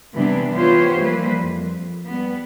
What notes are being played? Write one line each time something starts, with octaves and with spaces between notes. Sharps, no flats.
C3 E3 G3 B3 D4
E3 B3 F4 G4 C5 C#5
E3 F3 G3 A#3 B4 C5
F2
G3 B3